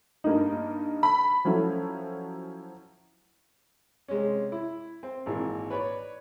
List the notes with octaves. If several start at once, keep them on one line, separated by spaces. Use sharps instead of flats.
G2 A#3 D#4
B5
F3 F#3 C#4 E4 A4
C3 G#3 C#4
E4
C4
G#1 A#2 E3
B4 C#5 D5 B5